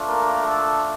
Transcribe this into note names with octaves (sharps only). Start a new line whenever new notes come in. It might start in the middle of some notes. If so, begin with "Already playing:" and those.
Already playing: A3 D4 F4
A#3 A#4
A4